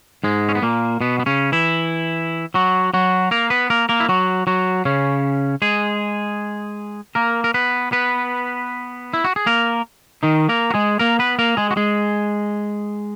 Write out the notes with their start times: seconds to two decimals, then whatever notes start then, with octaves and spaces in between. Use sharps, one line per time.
0.24 G#2 G#3
0.49 C#4
0.55 B3
0.62 A#2 A#3
1.01 B2 B3
1.20 B3
1.26 C#3 C#4
1.52 E3 E4
2.54 F#3 F#4
2.94 F#3 F#4
3.31 A#3 A#4
3.50 B3 B4
3.70 A#3 A#4
3.89 A#3 A#4
4.00 E4
4.09 F#3 F#4
4.47 F#3 F#4
4.85 C#3 C#4
5.62 G#3 G#4
7.15 A#3 A#4
7.44 A#4
7.54 B3 B4
7.92 B3 B4
9.14 E4
9.24 F#4
9.36 G#4
9.46 A#3 A#4
10.23 D#3 D#4
10.49 A#3 A#4
10.70 F#4
10.74 G#3 G#4
10.99 A#3 A#4
11.19 B3 B4
11.39 A#3 A#4
11.57 G#3 G#4
11.71 F#4
11.77 G#3 G#4